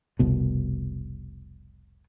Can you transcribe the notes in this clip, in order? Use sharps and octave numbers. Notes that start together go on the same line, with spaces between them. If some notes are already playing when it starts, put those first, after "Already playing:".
F1 C2 B2